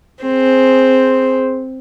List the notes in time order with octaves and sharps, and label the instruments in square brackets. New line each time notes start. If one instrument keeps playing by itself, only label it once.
[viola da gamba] C4 [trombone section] G#4 C5